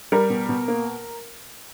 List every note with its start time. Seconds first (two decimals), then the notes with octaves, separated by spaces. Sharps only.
0.12 G3 A#4
0.30 B2
0.49 B2
0.68 A#3